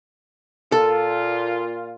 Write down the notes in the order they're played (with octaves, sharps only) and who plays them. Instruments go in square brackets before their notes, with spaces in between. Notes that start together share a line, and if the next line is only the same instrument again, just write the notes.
[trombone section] A#2 F4 [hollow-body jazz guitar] A4